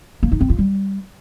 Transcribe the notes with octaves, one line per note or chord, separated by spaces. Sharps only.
A#3
D#4
C4
F4
G3